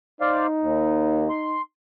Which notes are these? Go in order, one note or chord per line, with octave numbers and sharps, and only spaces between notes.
D#4 C5 D5 F5
D#2
C6